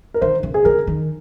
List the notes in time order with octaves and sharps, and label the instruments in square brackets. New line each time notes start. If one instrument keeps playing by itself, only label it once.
[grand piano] A#4
[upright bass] D#3 [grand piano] C5
[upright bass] C#3
[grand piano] G#4
[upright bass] C#3 [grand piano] A#4
[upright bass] D#3